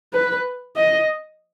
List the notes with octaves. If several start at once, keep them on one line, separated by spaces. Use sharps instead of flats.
B4
D#5